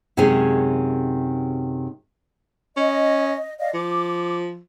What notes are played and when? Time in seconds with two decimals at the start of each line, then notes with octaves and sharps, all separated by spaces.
0.17 F#2 C3 D#3 G#3 C#4 G#4
2.77 C#4 D#5
3.58 D5 D#5 F5
3.74 F3 D6